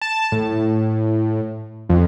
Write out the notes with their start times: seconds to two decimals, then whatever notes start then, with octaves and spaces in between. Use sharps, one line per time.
0.02 A5
0.32 A2
1.89 F2